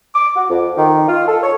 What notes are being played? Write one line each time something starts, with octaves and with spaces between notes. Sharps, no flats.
D6
F#4
F2
D#3
F4
A4
C#5